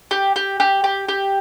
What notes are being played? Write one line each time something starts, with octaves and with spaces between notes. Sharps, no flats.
G4
G4
G4
G4
G4